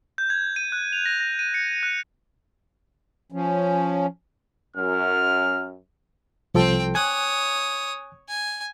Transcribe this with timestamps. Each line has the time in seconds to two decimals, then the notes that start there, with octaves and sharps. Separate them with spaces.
0.18 G6
0.30 G#6
0.56 D#7
0.72 F#6
0.93 F7
1.06 A#6
1.20 A#6
1.39 D#7
1.54 C#7
1.83 F#6
3.32 F3 C#4
4.76 F#2 F6
6.54 C2 F3 C4 A4 G5
6.95 C#5 G#5 D#6 F#6
8.28 G#5